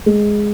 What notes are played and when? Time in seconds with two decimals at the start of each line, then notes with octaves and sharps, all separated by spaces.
0.06 G#3